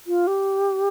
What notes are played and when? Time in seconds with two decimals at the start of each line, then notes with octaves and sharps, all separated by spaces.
0.07 F4
0.27 G4